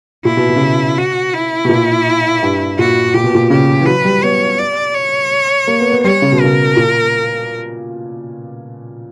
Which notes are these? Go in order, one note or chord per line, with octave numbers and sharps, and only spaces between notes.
A#2 E4
B2
B2
C#3
B2
F#4
E4
B2
A#2
G2
A#2 F#4
A#2 G4
B2
A#2
C#3 G4
E3
F#3 B4
G3
B3 C#5
D5
C#5
A#3
B3
B3
G3 C#5
C#3
B2
C#3 A#4
A#2